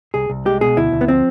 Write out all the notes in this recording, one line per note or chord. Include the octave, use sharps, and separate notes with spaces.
C2 G#4
C2
G#3 G4
B2 G#4
D2 E4
D2
B3
F3 C4